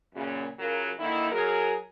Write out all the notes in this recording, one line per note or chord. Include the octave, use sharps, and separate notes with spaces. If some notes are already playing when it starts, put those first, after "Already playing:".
F#2 A#2 C#3
C#3 F#3 F4 A#4
D3 D#3 A#3 D#4 E4
F#3 G#4 A#4